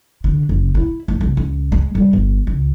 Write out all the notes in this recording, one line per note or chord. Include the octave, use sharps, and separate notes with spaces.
D3
F#1
E4
D2
C2
C#2
G#3
G3
G1
C#2